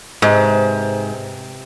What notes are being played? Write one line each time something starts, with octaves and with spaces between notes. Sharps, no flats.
G#2 C3 B4